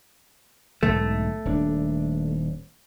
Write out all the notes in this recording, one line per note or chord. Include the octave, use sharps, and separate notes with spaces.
B1 G#2 D3 A3
D#1 C#4 D4